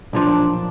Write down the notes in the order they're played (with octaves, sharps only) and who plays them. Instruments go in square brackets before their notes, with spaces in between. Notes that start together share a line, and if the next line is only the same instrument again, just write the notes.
[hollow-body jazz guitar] B1 A#2 F3 [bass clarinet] D4